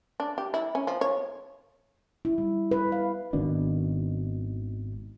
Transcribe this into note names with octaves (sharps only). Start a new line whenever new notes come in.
D4
G4
E4
C#4
F3
C#5
E4
G3
B4
F5
G#1 B2 D#3 D4